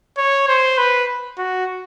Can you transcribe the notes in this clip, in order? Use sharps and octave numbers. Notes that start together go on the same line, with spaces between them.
C#5
C5
B4
F#4